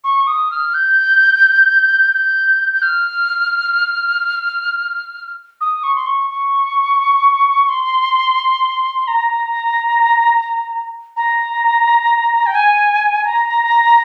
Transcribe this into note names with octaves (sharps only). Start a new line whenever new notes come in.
C#6
D#6
F6
G6
G6
G6
F6
D#6
C#6
C6
C#6
C#6
C6
A#5
A#5
G5
G#5
A#5